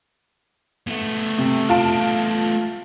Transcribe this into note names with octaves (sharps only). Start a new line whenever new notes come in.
A3 B3
C3
F4 A5 D7